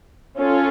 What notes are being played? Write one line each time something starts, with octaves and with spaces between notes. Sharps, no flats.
C#4 F4 A4 C#5